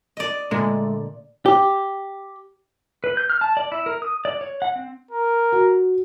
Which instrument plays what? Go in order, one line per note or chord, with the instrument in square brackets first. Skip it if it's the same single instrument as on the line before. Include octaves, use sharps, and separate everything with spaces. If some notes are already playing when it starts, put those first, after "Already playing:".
[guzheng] D5 D#5
[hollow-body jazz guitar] A#2 D3 [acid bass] G#3 [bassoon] A3
[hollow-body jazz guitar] G4
[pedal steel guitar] B4
G6
F6
A5
D5
E4
A#4
D#6
D5
C#5
F#5
C4
[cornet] A#4
[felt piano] F#4